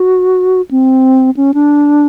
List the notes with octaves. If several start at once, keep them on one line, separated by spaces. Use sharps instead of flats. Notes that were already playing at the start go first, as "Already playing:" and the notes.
Already playing: F#4
C4
C#4
D4